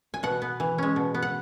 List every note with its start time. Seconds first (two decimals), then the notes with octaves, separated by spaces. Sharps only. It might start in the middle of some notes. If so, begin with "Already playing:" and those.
0.14 G#5
0.23 B2 F#5
0.42 B3
0.60 E3
0.78 G#3 C#4
0.96 B2
1.14 B3
1.22 F#5